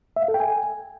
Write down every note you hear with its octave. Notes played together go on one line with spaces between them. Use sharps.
E5
F5
A4
G5
G#5